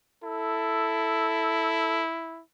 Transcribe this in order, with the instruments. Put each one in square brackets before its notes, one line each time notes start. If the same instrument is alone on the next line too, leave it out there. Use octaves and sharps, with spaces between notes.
[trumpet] E4 [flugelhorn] A4